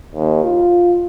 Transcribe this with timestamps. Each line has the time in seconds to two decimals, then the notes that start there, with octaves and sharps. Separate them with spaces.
0.14 D#2
0.44 F4